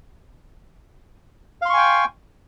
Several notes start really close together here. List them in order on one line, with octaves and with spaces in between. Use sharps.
F5 C6 C#6 G#5 G5